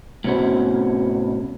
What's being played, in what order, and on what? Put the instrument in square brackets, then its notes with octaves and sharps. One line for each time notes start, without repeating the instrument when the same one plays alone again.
[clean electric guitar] A2 C3 B3 C#4 F#4 C5